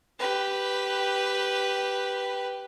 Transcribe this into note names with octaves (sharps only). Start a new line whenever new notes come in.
G4 B4